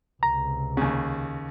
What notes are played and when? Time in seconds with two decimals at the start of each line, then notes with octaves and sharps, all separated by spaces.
0.23 C#2 C3 A#5
0.77 D#2 C#3